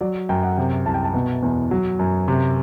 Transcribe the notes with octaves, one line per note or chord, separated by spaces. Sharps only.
F#3 D5
F#2 G5
F#5
C3 G5
C2 A5
G5
A5
B2
E2
F#3
F#2
C3